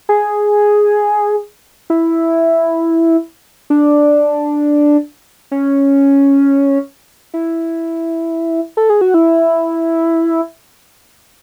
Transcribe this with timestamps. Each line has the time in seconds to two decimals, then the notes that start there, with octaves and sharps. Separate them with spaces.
0.09 G#4
1.90 E4
3.70 D4
5.51 C#4
7.34 E4
8.77 A4
8.90 G#4
9.01 F#4
9.14 E4